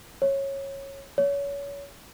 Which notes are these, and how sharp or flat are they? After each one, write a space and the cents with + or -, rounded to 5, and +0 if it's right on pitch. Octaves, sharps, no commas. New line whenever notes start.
C#5 -15
C#5 +30